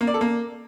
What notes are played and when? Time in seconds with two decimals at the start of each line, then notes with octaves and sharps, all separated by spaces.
0.01 A#3
0.07 D5
0.14 A4
0.21 A#3